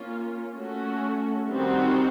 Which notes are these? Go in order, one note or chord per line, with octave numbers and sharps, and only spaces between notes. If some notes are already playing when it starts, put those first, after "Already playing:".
Already playing: A#3 C#4 F4
A3 C#4 F#4
D#3 G3 C4 D#4 F#4